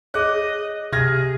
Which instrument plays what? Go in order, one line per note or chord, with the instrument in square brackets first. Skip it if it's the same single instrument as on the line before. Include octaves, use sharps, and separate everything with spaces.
[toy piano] G#4 C#5 [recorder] D#5 [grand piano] F#6
[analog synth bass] C3 [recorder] G#4 [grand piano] F6 G#6 A#6